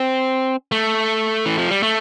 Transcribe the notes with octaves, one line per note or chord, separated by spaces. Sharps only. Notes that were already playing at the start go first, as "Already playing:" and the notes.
Already playing: C4
A3
E3
F3
G3
A3